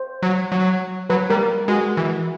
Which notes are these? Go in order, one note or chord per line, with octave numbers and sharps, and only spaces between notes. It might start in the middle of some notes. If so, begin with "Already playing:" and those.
Already playing: C5
F#3
F#3
F#3 B4
G3 A#4
G#3 F#4
E3